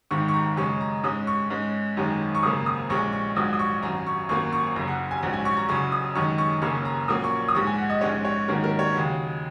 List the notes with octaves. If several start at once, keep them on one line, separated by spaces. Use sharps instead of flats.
G#1 G#2 D#3 C#6
C#6
A#5
F#2 C#3 G#3 C#4 C#6
A#5
G#2 G#3 C#4 D#6
C#6
G#2 G#3 C#4
G#1 F#2 D#3 G#3 C#4
C#6
G#1 F#2 C#3 A#3 D#6
D#6
A#1 A#2 G#3 C#4 C#6
C#6
A#1 G#2 F#3 D#6
D#6
C#6
G#1 F#2 F#3 C#4 A#5
C#6
G#1 F#2 F#3 A#3 C#4 C#6
C#6
F#1 F#2 C#3 A#5
F#5
G#5
A#1 G#2 F#3 C#4
G#5
C#6
A#5
F#1 F#2 C#3 F#3 C#6
D#6
F#2 D#3 G#3 C#4 C#6
C#6
F#1 F#2 C#3 A#3 C#4 C#6
A#5
A#1 A#2 F#3 A#3 C#4 D#6
C#6
D#6
A#1 G#2 G#3 C#6
G#5
F#5
D#5
A#1 G#2 G#3 C#4 C#5
C#5
G#2 D#3 F#3 A#3 C#4 A#4
A#4
C#5
D#2 C#3 F#3